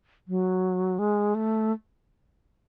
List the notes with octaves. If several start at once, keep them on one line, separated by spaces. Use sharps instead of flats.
F#3
G#3
A3